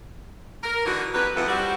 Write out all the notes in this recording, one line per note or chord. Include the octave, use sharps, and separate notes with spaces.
A#4
D3 E3 D#4 F#4
F2 F#3 G4 B4
F2 A2 E3 B3 F4 F#5
G3 C4 F#4